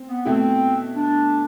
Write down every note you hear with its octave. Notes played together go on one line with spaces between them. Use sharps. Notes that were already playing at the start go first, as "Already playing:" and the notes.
Already playing: C4
B3
B2 A3 C4 E4
D4